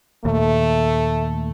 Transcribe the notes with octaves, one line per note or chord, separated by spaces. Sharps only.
D#2 A#2 A3